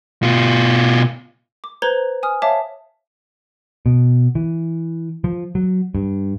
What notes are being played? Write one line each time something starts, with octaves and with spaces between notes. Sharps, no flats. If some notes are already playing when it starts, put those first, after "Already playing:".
B2 F4
D6
B4 C5 A#5 G#6 G7
G#5 D#6 F6
C#5 E5 F5 A5 D6
B2
E3
F3
F#3
G2